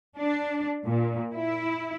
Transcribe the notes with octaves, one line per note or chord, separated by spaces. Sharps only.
D4
A#2
E4